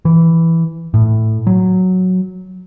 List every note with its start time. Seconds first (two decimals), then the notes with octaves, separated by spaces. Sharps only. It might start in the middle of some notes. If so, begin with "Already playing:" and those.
0.05 E3
0.94 A2
1.47 F#3